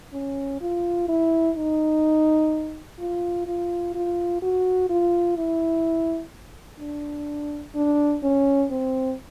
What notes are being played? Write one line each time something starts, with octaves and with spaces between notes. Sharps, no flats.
C#4
F4
E4
D#4
F4
F4
F4
F#4
F4
E4
D4
D4
C#4
C4